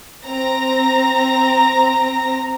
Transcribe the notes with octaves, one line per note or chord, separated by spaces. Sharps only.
C4 A#5 A#6